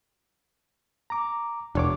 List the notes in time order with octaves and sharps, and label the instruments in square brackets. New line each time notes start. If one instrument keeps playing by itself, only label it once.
[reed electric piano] A#5 D6
[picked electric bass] E1 [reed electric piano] D4 C#5 D6